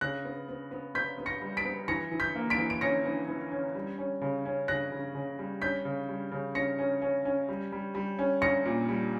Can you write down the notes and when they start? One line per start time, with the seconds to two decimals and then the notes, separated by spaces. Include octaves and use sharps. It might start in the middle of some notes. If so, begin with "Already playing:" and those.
0.01 C#3 F#6 A#6
0.25 B3
0.48 B3
0.71 B3
0.95 B3 G6 B6
1.18 B3
1.26 A#6 C#7
1.42 G3
1.57 B6 D7
1.65 B3
1.88 E3 A#6 C#7
2.12 E3
2.20 G6 B6
2.35 A#3
2.50 B6 D7
2.58 E3
2.70 D7
2.81 C#4 A#6 C#7
3.05 E3
3.28 E3
3.51 C#4
3.75 G3
3.98 C#4
4.21 C#3
4.45 C#4
4.68 C#3 F#6 A#6
4.92 C#3
5.15 C#3
5.39 G3
5.62 C#4 G6 B6
5.85 C#3
6.09 G3
6.32 C#3
6.55 C#4 A#6 C#7
6.79 C#4
7.02 C#4
7.25 C#4
7.49 G3
7.72 G3
7.95 G3
8.19 C#4
8.41 C#4 A#6 C#7
8.65 A#2
8.89 G3